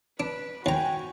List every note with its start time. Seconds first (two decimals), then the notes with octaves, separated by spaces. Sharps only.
0.20 D4 B4
0.66 D#2 F#4 G5 G#5 A#5